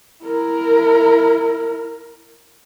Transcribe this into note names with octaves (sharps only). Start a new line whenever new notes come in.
E4 A#4